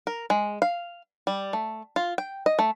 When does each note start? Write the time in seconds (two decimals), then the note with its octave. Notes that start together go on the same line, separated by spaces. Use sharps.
0.07 A#4
0.30 G#3
0.62 F5
1.27 G3
1.53 A3
1.96 F4
2.18 G5
2.46 D#5
2.59 A3